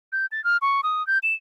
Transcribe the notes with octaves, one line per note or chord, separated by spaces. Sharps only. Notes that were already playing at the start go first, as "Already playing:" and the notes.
G6
A6
F6
C#6
D#6
G6
E7